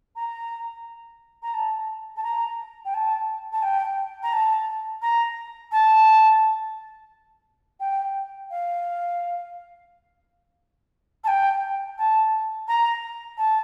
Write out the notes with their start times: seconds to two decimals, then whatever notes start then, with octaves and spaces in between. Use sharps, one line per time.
0.15 A#5
1.42 A#5
1.54 A5
2.16 A5
2.23 A#5
2.85 G5
2.94 A5
3.52 A5
3.62 G5
4.23 A#5
4.32 A5
5.02 A#5
5.71 A5
7.80 G5
8.50 F5
11.24 A5
11.27 G5
11.98 A5
12.68 A#5
13.37 A5